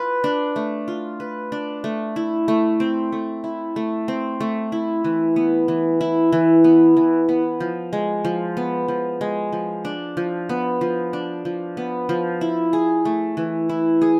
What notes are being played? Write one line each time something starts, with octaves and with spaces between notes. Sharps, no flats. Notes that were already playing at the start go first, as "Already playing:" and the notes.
Already playing: F4 B4
D4
A3
F4
B4
D4
A3
E4
A3
C4
A3
E4
A3
C4
A3
E4
E3
B3
E3
E4
E3
B3
E3
B3
F3
G#3
F3
B3
F3
G#3
F3
D4
F3
B3
F3
D4
F3
B3
F3
E4
G#4
A3
E3
E4
G#4